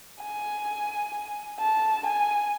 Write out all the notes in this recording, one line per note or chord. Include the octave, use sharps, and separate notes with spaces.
G#5
A5
G#5